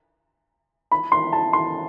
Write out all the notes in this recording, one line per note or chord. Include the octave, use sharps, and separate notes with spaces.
B5
C6
A5
C6